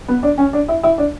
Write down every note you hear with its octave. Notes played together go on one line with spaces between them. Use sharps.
B3
D4
C#4
D4
E4
E4
D4